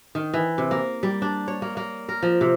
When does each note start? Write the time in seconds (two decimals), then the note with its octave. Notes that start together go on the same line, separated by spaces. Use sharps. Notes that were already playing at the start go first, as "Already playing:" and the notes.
0.15 D#3
0.34 E3
0.58 C3
0.71 A#3
1.03 G3
1.22 D4
1.48 C#5
1.62 A#3
1.77 A#3
2.09 A#4
2.23 F3
2.41 C3